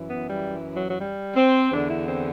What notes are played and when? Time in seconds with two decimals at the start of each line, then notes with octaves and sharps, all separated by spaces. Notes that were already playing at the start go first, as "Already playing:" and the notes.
Already playing: F#2 E3
0.09 B3
0.28 G3
0.75 F#3
0.90 F#3
0.99 G3
1.35 C4
1.71 E2 D3 D4
1.90 E4
2.07 C4